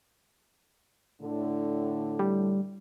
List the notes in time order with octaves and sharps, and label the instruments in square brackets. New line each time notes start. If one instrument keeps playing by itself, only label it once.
[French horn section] A2 D3
[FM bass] G3